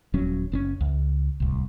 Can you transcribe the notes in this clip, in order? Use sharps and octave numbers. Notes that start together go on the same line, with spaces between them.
D#1 F#3 C#4
F#1 C4 C#4
C#2
D1 C2